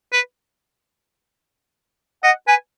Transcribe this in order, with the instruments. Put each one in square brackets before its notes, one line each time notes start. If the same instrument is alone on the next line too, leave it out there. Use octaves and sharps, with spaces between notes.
[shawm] B4
[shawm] D#5 [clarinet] F#5
[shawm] B4 [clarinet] G#5